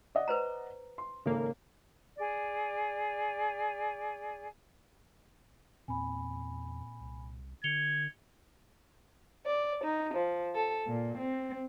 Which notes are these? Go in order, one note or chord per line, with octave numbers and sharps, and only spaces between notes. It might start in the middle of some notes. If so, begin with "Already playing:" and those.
D5 D#5 F#5
B4 C5 A#5
C6
G#1 C#3 A#3 A4
G#4 D5
E2 A#2 C4 G#5 B5
C2
D3 G#6 C#7 F7 G7
D5
D#4
F3
A4
A#2
C4